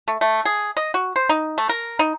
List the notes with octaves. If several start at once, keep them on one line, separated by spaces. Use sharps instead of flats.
A3
A3
G#4
D#5
F#4
C5
D#4
A3
A#4
D#4